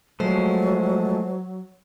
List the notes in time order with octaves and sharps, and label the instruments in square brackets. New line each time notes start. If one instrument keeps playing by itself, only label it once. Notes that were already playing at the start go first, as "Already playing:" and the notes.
[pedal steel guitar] F3 G#3 A3 [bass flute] F#3 [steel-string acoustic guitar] C5